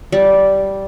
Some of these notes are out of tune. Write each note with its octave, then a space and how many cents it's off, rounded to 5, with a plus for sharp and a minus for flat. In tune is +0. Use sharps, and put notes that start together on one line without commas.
G3 -10